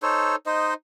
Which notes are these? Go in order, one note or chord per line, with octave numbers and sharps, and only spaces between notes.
D#4 A4 C5 C#5
D#4 C5 D#5